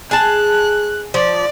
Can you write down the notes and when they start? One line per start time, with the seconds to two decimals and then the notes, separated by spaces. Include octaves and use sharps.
0.11 G#4 A5 F#6
1.14 F3 D5